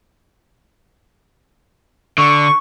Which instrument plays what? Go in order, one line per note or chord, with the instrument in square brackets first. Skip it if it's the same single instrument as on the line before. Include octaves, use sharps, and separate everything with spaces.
[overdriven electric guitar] D3 [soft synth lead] C#6